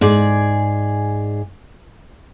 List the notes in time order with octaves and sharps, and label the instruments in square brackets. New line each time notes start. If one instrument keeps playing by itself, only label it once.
[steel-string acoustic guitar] G#2 G#4 D5